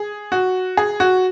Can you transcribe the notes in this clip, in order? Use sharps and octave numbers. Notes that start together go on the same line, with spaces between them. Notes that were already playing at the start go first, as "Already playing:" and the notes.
Already playing: G#4
F#4
G#4
F#4